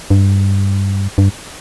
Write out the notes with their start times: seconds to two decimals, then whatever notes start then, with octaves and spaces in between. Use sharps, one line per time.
0.10 G2
1.18 G2